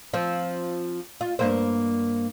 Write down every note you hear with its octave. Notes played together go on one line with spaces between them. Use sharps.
F3 C4
F4
G2 A#3 C5